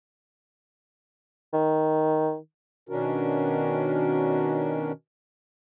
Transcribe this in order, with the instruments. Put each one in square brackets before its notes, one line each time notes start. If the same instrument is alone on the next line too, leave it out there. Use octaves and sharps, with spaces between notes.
[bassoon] D#3
[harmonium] B2 D#3 C#4 D4 F#4 A#4